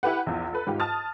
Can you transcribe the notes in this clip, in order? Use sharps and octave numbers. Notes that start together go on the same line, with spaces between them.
E4 G4 B4 F#5
A#1 E2
A4 B4
G#2 F4 G4
A5 D#6 F6 A6